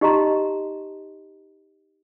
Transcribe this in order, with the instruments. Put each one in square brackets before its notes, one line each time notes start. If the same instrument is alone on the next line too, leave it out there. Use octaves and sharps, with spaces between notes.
[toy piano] D#4 G4 D#5 A5 A#5 C6